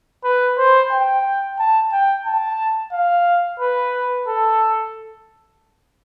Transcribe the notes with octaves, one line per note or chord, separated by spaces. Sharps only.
B4
C5
G5
A5
G5
A5
F5
B4
A4